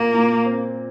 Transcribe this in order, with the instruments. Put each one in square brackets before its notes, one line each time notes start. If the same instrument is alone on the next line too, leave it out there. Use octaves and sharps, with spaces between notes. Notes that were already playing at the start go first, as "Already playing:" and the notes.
Already playing: [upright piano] A#2 [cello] A#3
[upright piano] A#2
C4